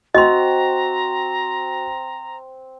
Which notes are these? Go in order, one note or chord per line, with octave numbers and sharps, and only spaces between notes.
C4 F#4 D#5 A#5 C6